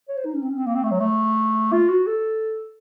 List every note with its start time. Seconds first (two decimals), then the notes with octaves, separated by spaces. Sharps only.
0.08 C#5
0.17 C5
0.25 D#4
0.34 C#4
0.42 C4
0.50 C#4
0.58 C4
0.66 A#3
0.75 C4
0.83 A3
0.91 F#3
1.00 A3
1.73 F4
1.89 F#4
2.07 A4